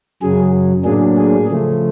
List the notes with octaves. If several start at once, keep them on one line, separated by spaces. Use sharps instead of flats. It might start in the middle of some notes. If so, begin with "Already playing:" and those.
F#2 C#3 F#3 G#4
A2 F#3 A#3 D4 G#4
G#4
C#3 F3 A3